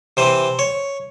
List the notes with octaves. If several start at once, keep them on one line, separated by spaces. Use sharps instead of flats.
C3 E3 C4 C5
C#5